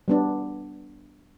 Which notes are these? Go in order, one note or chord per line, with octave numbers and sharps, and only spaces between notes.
G3 B3 D4